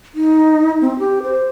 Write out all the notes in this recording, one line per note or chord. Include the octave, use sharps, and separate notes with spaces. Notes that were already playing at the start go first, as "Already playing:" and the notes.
D#4
C4
G4
C5